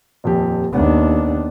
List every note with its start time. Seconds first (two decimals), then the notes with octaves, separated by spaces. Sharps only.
0.24 D#1 F2 G4
0.73 D#2 B3 D4